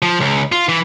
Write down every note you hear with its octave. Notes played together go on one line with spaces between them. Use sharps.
F3
C#2
F4
E3